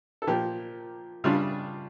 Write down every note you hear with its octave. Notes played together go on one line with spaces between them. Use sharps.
A4
A#2 F3 A#3 G4
C#3 G3 D4 F4